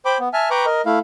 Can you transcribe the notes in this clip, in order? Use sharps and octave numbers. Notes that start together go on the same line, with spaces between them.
C5 G5 B5 D6
B3
E5 G#5 A5 F6
B4 G5 A#5 B5 C#6 D6
A#4 D#5
A3 E4 F5